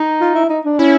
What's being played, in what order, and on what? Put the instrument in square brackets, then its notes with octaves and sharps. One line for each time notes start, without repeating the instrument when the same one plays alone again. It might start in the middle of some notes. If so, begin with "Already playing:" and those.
Already playing: [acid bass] D#4
[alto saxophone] F4
E4
D#4
D4
[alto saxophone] C#4 [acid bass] E4